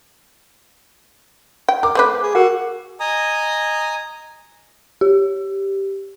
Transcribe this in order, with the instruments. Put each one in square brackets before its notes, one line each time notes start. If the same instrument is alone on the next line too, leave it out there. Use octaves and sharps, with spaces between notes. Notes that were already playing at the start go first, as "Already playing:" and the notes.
[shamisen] G5
[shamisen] A#4 [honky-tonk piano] D6
[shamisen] A3 C4 B4
[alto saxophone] G#4
[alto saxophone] F#4 [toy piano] A#4 F#5
[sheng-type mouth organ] D#5 G#5 A#5 D#6
[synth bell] G4